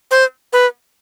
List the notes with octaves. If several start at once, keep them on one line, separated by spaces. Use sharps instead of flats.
C5
B4